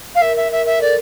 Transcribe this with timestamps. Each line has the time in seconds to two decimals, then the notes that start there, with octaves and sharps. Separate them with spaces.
0.15 F5
0.21 A#4 E5
0.36 E5
0.52 E5
0.65 A#4 E5
0.79 A4 D5